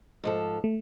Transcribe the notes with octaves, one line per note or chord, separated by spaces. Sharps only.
G#2 F3 A4
A3